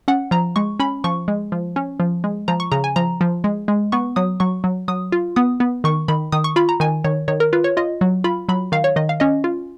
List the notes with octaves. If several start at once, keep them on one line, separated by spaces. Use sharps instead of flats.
C#4 F#5
F3 A#5
G#3 C#6
C#4 B5
F3 C#6
G#3
F3
C#4
F3
G#3
F3 A#5
C#6
C#3 A#5
G#5
F3 A#5
F3
G#3
G#3
B3 C#6
F#3 D#6
F#3 C#6
F#3
F#3 D#6
F4
B3 D#6
B3
D#3 C#6
D#3 B5
D#3 D#6
C#6
F4 B5
A#5
D#3 G#5
D#3 C#5
D#3 C#5
A#4
F4 B4
C#5
F4 D#5
F#3
F4 B5
F#3 B5
D#3 F5
C#5
D#3 D#5
F5
C#4 D#5
F4